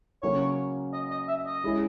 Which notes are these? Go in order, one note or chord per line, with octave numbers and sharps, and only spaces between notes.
C#3 F#3 A#3 C#4 C#5
D#5
D#5
E5
D#5
G#3 C#4 E4 G#4